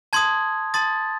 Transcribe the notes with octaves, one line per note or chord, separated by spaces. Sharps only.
A5 C6 D#6 G#6
A5 C6 D#6 A6